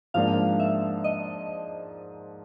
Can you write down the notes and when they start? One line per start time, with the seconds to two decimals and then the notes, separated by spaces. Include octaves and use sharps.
0.14 G#2 F3 A#3 D4 F5
0.60 E5
1.04 D#5